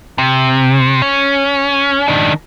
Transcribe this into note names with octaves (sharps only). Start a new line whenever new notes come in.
C3
C#4
D#3 D4